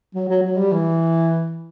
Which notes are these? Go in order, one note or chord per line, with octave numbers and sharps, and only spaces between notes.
F#3
F#3
F#3
G3
E3